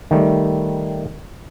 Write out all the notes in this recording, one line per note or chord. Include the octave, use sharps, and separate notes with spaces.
D#3 G3 A3